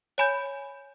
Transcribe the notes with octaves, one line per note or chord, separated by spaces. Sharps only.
C#5 G#5 B5 G6